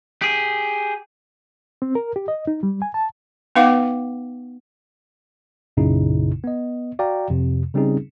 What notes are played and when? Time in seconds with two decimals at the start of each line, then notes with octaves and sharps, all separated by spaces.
0.22 G4 G#4
1.82 C4
1.95 A#4
2.16 G4
2.28 D#5
2.47 D#4
2.63 G3
2.82 G#5
2.94 A5
3.56 B3 D#4 B4 F5 F#5 D6
5.77 B1 F#2 A#2 C#3 D#4 E4
6.44 B3 D#5
6.99 F#4 D5 F5 G5 A#5
7.30 F2 C3
7.74 C#3 G3 C4 C#4 D#4 G#4